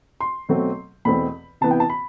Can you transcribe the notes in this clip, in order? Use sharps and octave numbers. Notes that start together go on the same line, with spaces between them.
C6
B2 F#3 A3 C4
E2 B2 A3 C4 B5
C3 E3 B3 A5
G5
A5
B5